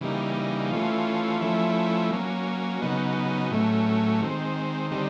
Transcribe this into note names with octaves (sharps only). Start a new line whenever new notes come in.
C#3 E3 G3 A#3 D#4
E3 A3 C#4 F4
F3 A3 C#4 E4
F#3 A#3 C#4
C#3 F#3 B3 D#4
A2 F#3 A3 C#4
D#3 G#3 C4
D3 G3 C4 D#4